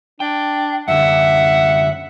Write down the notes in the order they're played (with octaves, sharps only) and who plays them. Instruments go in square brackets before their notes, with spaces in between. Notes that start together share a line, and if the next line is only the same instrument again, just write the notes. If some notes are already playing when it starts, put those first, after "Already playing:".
[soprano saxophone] D4 [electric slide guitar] G5
[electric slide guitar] F#2 D3 [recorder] E5 [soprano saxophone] F#5